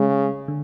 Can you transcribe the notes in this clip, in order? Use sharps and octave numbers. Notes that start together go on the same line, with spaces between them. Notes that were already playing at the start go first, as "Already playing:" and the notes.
Already playing: C#3 G#3
D3